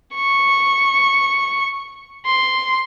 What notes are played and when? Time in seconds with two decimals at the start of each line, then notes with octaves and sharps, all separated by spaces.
0.15 C#6
2.26 C6